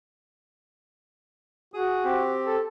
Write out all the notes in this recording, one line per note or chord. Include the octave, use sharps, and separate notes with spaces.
F#4 G#4 D#6
C4 G4
A4